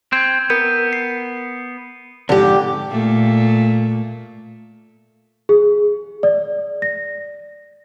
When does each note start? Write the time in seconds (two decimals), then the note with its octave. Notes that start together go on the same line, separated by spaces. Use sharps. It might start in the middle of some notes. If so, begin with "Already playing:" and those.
0.12 C4 G6 G#6
0.50 B3 A#4 G6
0.93 C7
2.29 F2 G#2 D3 G4
2.90 A#2 A3
5.49 G#4
6.23 D5
6.82 A#6